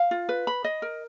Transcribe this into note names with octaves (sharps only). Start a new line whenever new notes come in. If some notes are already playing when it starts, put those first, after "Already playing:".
Already playing: F5
F4
B4
B5
D#5
A#4